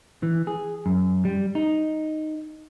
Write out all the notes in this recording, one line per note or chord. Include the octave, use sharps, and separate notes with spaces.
E3
G#4
F#2
G3
D#4